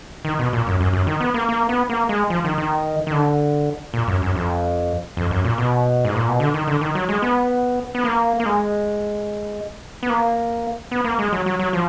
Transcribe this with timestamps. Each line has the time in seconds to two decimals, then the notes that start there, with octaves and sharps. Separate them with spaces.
0.25 D#3
0.39 B2
0.53 A#2
0.67 F#2
0.81 F#2
0.93 F#2
1.07 D#3
1.20 B3
1.34 A#3
1.49 A#3
1.69 B3
1.89 A#3
2.09 G#3
2.30 F3
2.44 D#3
2.58 D#3
3.07 D#3
3.12 D3
3.94 A#2
4.08 F#2
4.22 F#2
4.36 F2
5.17 F2
5.31 F#2
5.44 A#2
5.58 B2
6.05 G#2
6.16 A#2
6.28 B2
6.40 D3
6.54 D#3
6.67 D3
6.81 D#3
6.95 F#3
7.09 G#3
7.22 B3
7.95 B3
8.05 A#3
8.40 A#3
8.46 G#3
10.03 B3
10.10 A#3
10.91 B3
11.05 A#3
11.19 G#3
11.33 F#3
11.46 F#3
11.59 F#3
11.73 F3